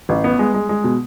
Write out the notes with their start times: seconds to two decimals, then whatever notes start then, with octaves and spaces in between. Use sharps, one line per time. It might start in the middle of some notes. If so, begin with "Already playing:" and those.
0.09 A1
0.24 B3
0.39 G#3
0.54 G#3
0.69 G#3
0.84 B2